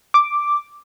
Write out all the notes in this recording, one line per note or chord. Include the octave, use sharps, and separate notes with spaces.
D6